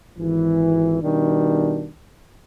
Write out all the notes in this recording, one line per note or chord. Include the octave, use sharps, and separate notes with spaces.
G#1 E3
B2 D#3 G3 D4